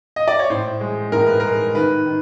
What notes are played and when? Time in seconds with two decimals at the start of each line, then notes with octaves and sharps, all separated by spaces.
0.16 D#5
0.28 D5
0.39 C#5
0.50 A2 C5
0.80 G#3
1.12 A2 A#4
1.26 B4
1.40 G#3 A#4
1.75 D#3 B4
2.06 D#3